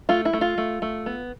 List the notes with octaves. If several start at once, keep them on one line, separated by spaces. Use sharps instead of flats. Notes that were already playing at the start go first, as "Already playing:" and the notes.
A3 F4
E4
A3
F4
A3
A3
B3